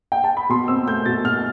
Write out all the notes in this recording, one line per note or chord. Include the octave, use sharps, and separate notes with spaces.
G5
A5
B5
B2 C6
C4 E6
A3 G6
B2 A6
B2 F6